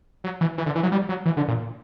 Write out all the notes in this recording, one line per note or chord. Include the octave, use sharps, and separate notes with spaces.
F#3
E3
E3
D3
E3
F#3
G3
F#3
E3
D3
A#2